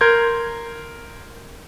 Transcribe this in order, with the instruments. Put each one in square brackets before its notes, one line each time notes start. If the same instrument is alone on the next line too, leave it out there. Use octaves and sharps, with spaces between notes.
[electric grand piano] A#4 C6 G6 G#6